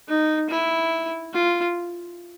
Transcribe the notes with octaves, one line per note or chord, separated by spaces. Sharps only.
D#4
E4
F4